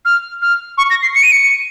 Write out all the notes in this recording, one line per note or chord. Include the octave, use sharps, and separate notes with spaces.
F6
F6
C#6
A#6
C7
C#7
D#7
C#7